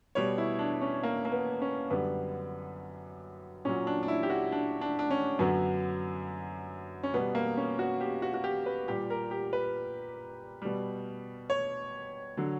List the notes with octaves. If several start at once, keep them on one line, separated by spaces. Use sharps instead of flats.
B2 G3 C#5
E4
D4
C#4
A#3
A#3
B3
C#4
F#2 D3 G3 B3
A#2 F#3 C#4
D4
D4
E4
G4
F#4
D4
D4
D4
C#4
F#2 D3 F#3 B3
C#4
B2 G3 B3
A#3
C#4
F#4
G4
F#4
F#4
G4
B4
A#2 G3 G4
A#4
G4
B4
B2 G3
C#5
D3 F#3